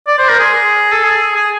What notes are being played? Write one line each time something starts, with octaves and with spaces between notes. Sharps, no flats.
D5
C5
A#4
G#4
A4
G#4
G#4